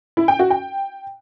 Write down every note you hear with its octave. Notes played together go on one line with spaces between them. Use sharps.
E4
G5
F#4
G5